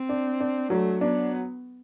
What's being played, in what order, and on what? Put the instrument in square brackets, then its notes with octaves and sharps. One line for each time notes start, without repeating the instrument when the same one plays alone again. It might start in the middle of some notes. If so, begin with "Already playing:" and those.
Already playing: [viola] C4
[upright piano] D4
D4
[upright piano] F#3 [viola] A3
[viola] B3 [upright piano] D4